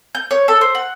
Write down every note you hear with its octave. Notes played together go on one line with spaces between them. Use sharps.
G6
C#5
A4
C5
F#5